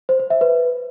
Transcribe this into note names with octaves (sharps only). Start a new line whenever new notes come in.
C5
C5
E5
B4